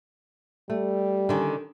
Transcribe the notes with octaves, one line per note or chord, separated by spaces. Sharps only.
G3 A3
D3 D#3 C#4